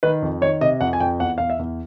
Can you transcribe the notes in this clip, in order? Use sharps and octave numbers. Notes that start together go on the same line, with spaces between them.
D#3 B4
F2
D#3 C#5
C3 D#5
F2 F#5
G#5
F2 G5
E2 F#5
E2 F5
E5
E2